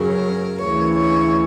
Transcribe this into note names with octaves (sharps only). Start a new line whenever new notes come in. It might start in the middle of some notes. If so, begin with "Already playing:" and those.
Already playing: F#2 C#3 F#3 A#4
D2 C#3 E3 C#5
C#5